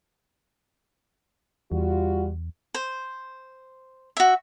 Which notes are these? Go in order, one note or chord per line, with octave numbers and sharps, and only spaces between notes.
E2 G3 F4 F#4
C5
F#4 E5